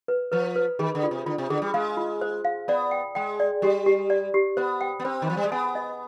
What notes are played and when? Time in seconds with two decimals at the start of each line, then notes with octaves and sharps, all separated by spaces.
0.08 B4
0.32 F3 B4
0.56 B4
0.79 D#3 G#4
0.95 D3
1.03 F4
1.11 C3
1.26 D3 F4
1.38 C3
1.50 D3 G#4
1.62 G3
1.74 G#3 F5
1.97 F4
2.21 C5
2.45 F5
2.68 B3 D5
2.91 G5
3.15 G#3 G5
3.40 D5
3.62 G3 G4
3.86 G4
4.10 D5
4.34 G4
4.57 B3 C5
4.81 G5
5.00 B3
5.05 C4 C5
5.22 D#3
5.28 F3 C5
5.37 G3
5.44 G#3
5.52 B3 G#5
5.75 D#5